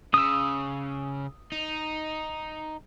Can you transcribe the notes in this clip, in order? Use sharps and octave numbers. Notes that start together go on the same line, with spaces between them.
C#3 D#6 E6
D#4